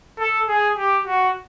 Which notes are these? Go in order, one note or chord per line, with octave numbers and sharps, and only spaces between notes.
A4
G#4
G4
F#4